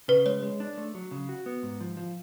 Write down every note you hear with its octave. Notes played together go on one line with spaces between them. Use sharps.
C#3 B4
G#3 C#5
G#3
D4
A3
F#3
C#3
F#4
B3
G#2
F3
F3